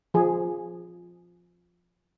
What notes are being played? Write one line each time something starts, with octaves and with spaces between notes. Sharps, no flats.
F3 G#4